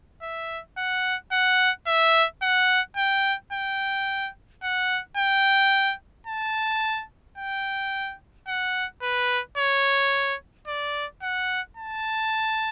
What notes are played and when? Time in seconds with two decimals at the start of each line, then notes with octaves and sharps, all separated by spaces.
0.22 E5
0.77 F#5
1.32 F#5
1.87 E5
2.43 F#5
2.97 G5
3.53 G5
4.63 F#5
5.18 G5
6.27 A5
7.38 G5
8.48 F#5
9.02 B4
9.58 C#5
10.67 D5
11.23 F#5
11.77 A5